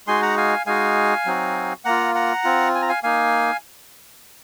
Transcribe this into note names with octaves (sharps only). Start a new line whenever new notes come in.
G#3 D#4 F#4 G#5 C6
F#5 A#5
F5 G#5
G#3 D#4 F#4 F5 G#5
F#3 C4 D#4 F#4
A#3 F4 F#5 A#5
F#5 A#5
C4 F4
G#5
A#5
F5 G#5
A#3 D#4 F5 G#5